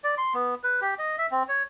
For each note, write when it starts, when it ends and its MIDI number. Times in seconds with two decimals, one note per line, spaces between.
0.04 0.15 74
0.18 0.34 84
0.34 0.55 59
0.64 0.80 71
0.81 0.94 67
0.99 1.16 75
1.18 1.27 76
1.32 1.43 60
1.49 1.63 73